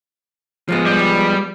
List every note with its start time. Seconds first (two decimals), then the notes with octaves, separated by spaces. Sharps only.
0.69 F3 G#3 B3
0.86 G3